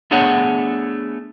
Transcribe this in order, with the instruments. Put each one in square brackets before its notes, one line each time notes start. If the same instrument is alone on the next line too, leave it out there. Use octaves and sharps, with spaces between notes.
[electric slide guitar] A3 B3 D4 G#4 C#5 F#5